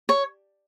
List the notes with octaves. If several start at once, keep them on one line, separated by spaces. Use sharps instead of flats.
C#5